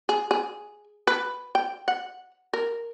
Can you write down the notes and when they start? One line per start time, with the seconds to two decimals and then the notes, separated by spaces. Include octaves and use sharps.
0.09 G#4
0.31 G#4
1.07 B4
1.55 G5
1.88 F#5
2.53 A#4